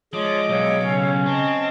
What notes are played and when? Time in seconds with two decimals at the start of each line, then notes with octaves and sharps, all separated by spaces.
0.13 F3 G#3 C#5 D#5 C6 D6
0.49 B1 C#5 F5 E6
0.82 C#3 C#4
1.26 C4 D#5 A5